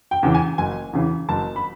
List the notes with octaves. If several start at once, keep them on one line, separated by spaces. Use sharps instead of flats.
G5
E2 C#3 E3
G#5
F#1 G#5
E2 C#3 E3
F#1 A5
B5